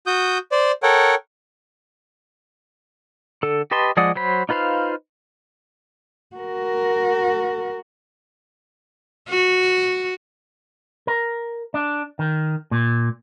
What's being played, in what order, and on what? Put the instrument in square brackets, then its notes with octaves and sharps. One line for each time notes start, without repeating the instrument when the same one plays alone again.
[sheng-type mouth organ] F#4 D#6 G6
C5 D5
A4 A#4 C#5 F#5 G5
[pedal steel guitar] D3 A4
G4 B4 D#5 A5 C6
F3 G#3 D5 F#5 D#6
F#3 C5 B5
D#4 F4 B4 C5 F5
[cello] F#4 A#4
[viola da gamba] F#4
[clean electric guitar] A#4
D4
D#3
A#2